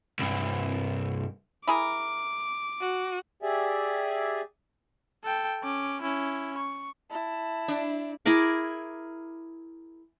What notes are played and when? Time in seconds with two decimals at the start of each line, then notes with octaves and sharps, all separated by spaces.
0.19 C2 G2
1.67 E4 G#4 A#4 D6
2.80 F#4
3.43 G4 G#4 D5 E5 G#5
5.24 A4 G5
5.63 C#4 D6
6.02 C#4 E4
6.58 C#6
7.11 E4 A5
7.68 D4
8.26 E4 G#4 A#4 D6